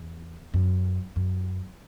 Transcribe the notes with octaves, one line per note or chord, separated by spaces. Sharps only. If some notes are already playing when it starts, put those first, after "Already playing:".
Already playing: E2
F#2
F#2